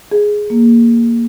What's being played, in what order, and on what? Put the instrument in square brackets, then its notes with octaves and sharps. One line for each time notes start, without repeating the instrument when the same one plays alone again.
[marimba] G#4
A#3